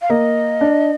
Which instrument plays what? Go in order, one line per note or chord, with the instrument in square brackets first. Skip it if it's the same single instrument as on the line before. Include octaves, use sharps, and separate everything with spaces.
[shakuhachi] F5
[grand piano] A#3 [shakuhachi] D#5
[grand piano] D4